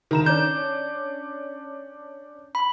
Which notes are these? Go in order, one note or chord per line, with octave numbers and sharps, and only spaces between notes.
D#3 A#5 E7
C#4 D4 G6
B5